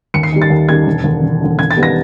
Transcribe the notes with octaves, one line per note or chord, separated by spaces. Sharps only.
D#2 C#7
C7
D#3 G3
A6
D#2
D#3 G3 G#6
E1
D#2 D3
E1
D#2 D3
E1 G#6
A6
D#3 G3 B3
A#6